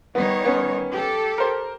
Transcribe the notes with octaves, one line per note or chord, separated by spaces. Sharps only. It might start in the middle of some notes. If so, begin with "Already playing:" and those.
D#3 G3 B3 C#5
B3 C#4
G4 A4
A#4 C5